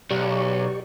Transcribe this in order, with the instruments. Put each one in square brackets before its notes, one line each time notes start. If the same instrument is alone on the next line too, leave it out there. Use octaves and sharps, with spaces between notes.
[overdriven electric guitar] B1 [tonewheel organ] G4 D5 C#6